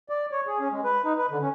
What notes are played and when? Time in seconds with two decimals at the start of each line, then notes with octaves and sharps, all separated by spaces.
0.09 D5
0.32 C#5
0.47 G#4
0.60 C#4
0.72 G#3
0.84 B4
1.05 D#4
1.18 B4
1.30 D3
1.42 C#4